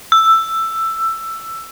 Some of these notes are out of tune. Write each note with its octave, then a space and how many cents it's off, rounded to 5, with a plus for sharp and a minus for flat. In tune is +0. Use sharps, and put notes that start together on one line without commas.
E6 +10